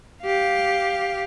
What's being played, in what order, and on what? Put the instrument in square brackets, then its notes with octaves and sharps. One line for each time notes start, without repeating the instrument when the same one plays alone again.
[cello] G4 F5